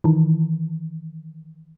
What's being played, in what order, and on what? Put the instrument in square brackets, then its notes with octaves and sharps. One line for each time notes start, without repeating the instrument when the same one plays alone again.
[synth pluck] D#3 E3